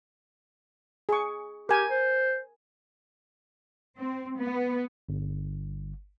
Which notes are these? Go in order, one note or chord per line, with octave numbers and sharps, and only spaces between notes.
G#4 C#6
G4 A#4 G#5
C5
C4
B3
G1